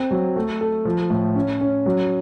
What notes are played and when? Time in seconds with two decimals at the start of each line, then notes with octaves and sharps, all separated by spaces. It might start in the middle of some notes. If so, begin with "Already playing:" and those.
Already playing: C4
0.11 F#3
0.36 A3
0.61 A4
0.85 F3
1.10 A2
1.35 C#4
1.61 C#4
1.86 F#3